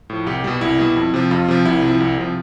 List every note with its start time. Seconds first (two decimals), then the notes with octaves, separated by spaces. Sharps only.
0.10 A2 F3
0.26 C2 G4
0.44 B2 G3
0.61 C2 E4
0.78 B2 G3
0.96 F2
1.14 C3 F3
1.31 F2 F4
1.48 C3 F3
1.65 C2 E4
1.83 C3 F3
2.00 C2
2.17 C3 F3